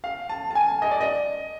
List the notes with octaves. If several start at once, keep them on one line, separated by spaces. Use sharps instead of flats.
F5
A5
A5
G#5
D#5
D5
D#5